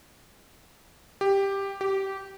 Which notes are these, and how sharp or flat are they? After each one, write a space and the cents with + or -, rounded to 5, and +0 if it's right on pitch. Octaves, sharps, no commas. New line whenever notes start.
G4 +5
G4 -20